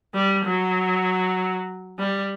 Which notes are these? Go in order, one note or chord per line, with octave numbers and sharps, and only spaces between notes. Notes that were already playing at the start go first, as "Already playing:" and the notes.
G3
F#3
G3